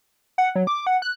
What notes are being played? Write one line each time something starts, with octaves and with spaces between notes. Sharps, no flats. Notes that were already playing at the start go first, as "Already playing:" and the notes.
F#5
F#3
D6
F#5
F#6